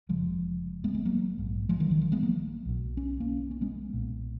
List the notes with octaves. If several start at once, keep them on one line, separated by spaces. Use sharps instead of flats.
F1 F2 C#3 F3 G#3
G#3 B3
G#3 B3
F#3 A#3
A#1 G#2
F3 G#3
D#3 F#3
D#3
F3
G#3 B3
F#3 A#3
B1 B2
C#4
A#3 C#4
C#4
G#3 B3
B1 A#2